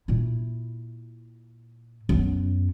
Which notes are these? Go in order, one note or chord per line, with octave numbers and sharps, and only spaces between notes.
A#2 E4
F#2 B3